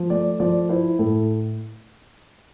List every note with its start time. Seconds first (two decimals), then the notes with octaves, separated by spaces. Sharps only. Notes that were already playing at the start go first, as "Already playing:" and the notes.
Already playing: F3
0.10 A3 D5
0.40 F3 D5
0.69 E4 C5
0.99 A2 A4